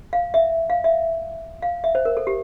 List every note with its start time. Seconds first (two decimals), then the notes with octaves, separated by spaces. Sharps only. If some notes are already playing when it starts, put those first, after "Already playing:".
0.13 F5
0.34 E5
0.70 F5
0.84 E5
1.62 F5
1.84 E5
1.95 C5
2.05 A#4
2.17 A4
2.27 G4